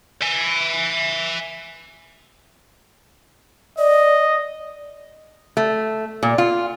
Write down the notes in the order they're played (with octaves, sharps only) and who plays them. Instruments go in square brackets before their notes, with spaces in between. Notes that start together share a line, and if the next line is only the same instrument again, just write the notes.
[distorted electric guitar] E5 G#5
[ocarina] D5 [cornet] D#5
[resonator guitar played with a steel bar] A3
A#2
F4